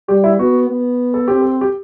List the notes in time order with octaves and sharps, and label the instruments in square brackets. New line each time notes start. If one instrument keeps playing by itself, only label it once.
[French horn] G3 [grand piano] G4
[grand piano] E4
[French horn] B3 [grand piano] F#4
[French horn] B3
[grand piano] A4
[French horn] C4 [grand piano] G4
[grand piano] A4
G4